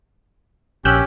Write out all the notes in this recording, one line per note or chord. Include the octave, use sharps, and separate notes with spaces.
A#1 C#4 G4 E6 F#6 G6